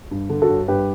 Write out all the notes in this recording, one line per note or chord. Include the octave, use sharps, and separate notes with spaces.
G2
D3
F#4 A4
G1
G2 G4 B4